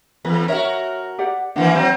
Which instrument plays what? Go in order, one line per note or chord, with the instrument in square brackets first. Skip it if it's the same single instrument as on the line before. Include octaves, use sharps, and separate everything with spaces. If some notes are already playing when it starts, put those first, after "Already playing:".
[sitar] E2 [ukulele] B4
[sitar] F#4 A#4 [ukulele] C#5 E5
[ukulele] G4 D5 F#5
[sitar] D#3 E3 A#3 [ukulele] D4 F#5
[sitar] F#3 C4 [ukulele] C5